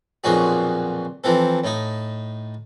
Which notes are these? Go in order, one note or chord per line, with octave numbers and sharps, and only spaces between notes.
B1 F2 A#2 F#4 G#4
E3 F3 C4 A4
A2 D#4